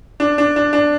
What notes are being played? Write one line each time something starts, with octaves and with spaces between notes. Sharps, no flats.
D4
D4
D4
D4